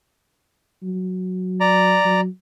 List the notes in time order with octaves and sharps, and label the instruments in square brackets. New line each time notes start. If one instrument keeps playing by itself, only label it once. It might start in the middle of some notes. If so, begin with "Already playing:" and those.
[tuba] F#3
[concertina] D5 A#5
[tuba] F#3